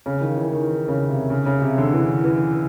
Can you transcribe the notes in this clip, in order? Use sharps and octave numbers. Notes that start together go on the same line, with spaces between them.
C#3
D#3
E3
D#3
C#3
C3
C#3
C#3
C3
D3
E3
E3